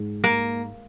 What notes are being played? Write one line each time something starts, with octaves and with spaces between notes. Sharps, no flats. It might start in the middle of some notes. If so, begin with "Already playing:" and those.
Already playing: G#2
A#3